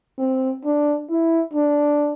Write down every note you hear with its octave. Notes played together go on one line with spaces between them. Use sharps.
C4
D4
E4
D4